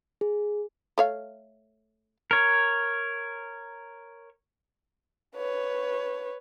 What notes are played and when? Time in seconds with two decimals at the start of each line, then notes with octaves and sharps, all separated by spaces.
0.21 G#4
0.98 A3 C#5 F5
2.31 A#4 C#5
5.36 B4 C#5